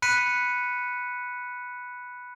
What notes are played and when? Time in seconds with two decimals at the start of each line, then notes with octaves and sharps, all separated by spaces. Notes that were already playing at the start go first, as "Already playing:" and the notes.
0.02 B5 F#6 B6 C#7 D#7